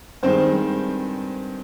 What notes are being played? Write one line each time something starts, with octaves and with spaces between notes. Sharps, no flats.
G2 D#3 G#3 C4 C5